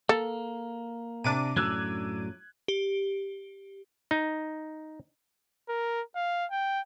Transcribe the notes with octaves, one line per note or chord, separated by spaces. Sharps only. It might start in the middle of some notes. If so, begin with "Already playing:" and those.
A#3 A4
C3 D4 D6 D#7
F#2 A2 F#3 E6 F#6 G#6
G4
D#4
A#4
F5
G5